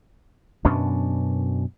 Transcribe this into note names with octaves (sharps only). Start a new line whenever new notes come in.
F#2 B2 C#4 D4